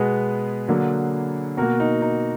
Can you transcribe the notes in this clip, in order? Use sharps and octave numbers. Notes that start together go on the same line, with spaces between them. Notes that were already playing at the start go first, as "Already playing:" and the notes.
Already playing: B2 G#3 B3 G#4 B4
D3 F#3 A#3
B2 A#3 F#4 A#4
D#4
D#4